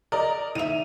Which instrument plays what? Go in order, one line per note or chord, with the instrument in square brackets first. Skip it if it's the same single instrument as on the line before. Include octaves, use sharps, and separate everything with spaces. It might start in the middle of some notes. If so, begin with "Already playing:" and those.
[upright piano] A#4 D5 D#5
[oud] D#3 E5 [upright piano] D#7 F7